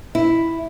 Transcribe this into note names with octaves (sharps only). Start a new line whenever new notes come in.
E4